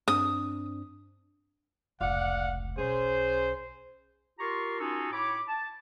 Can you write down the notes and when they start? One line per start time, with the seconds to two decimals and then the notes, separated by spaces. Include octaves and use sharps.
0.08 G2 C4 D4 D#6
2.01 F1 C#2 D5 F5 F#5
2.78 B1 C#4 G#4 C5
4.39 F4 G4 A#4 A#5 C6 C#6
4.80 C#4 D#4 F4 F#4 G#4 A4
5.11 A2 C#5 B5 D6
5.47 A5